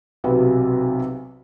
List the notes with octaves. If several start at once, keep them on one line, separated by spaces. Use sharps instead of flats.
B1 C3 F#3 B4